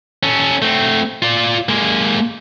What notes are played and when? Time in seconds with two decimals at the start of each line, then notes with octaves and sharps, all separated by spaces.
0.23 C#4 A4
0.62 A3 C4
1.22 F4 D5
1.69 G#3 A#3